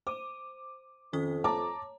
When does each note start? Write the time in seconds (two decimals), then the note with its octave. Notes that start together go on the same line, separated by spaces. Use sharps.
0.07 C5 D6 D#7
1.13 F2 D#3 C#4 D#6
1.44 C#5 A5 A#5 D6